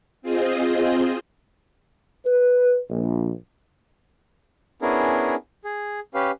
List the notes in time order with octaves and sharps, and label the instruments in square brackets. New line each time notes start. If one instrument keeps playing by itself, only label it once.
[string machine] C4 F4 G#4 C5 D#5
[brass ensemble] B4
A#1
[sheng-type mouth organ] B3 C#4 D4 E4 G#4 A#4
G#4
C#4 G4 B4 F5